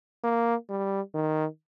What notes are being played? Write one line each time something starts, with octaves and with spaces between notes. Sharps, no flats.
A#3
G3
D#3